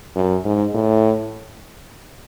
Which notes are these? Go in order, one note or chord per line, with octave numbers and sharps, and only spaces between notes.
F#2
G#2
A2